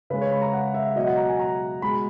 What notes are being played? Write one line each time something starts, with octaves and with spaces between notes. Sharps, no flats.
C#3 G#3 B4
C#5
B5
A#5
F#5
E5
B2 F#3 D#5
F#5
A#5
G#5
A#5
B2 G#3 B5